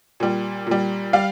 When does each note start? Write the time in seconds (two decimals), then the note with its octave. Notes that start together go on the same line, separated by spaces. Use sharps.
0.20 A#2 G3
0.67 A#2 G3
1.13 G3 F5